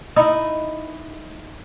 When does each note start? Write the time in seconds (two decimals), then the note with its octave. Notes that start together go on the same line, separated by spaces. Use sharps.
0.16 D#4 E4 D#5